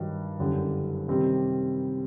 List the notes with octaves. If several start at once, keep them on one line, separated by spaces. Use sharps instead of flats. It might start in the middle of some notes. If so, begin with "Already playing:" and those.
Already playing: G2 D#3 F#3
F#1 F#2 D3 G3
C3 D#3 G3 C4